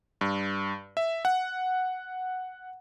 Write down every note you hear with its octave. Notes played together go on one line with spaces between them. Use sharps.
G2
E5
F#5